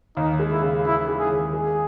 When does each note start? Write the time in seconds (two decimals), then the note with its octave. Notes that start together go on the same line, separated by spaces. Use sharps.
0.17 D#2 D#4
0.39 G#3
0.51 E4
0.62 C#3
0.86 E3 E4
1.08 G#3
1.19 G#4
1.31 D#2
1.53 G#3 G#4